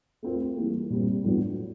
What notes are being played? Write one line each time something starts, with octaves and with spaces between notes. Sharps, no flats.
A3 C4 F4 A#4
E3 G3 A#3
A#2 G3 C4
A2 F#3 B3 D4 F4